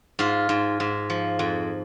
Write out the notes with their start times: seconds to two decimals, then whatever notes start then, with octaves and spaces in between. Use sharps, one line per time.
0.19 G#2 F4
0.49 G#2
0.80 G#2
1.10 F3
1.39 F2